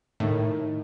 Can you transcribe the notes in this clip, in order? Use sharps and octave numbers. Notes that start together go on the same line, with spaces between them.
A2 D#3